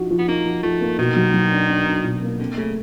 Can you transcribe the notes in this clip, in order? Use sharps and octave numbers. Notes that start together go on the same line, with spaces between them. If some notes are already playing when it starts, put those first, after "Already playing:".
Already playing: F3 D#4 F#4
F3
B3
A#3 D#4
F3
F3 A3
A#3
B2 D#3
F#3
F#3
D4
D4
D4
B2
A#3
D3 C4
C#3 A3